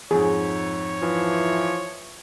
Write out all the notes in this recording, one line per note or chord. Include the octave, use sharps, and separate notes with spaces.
F2 G#2 G#4 C#5
E3 F3